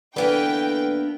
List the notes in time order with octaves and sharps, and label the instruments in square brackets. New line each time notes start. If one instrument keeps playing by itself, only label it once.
[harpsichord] D3 E3 [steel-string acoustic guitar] A#3 B3 B4 [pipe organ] D4 [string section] G5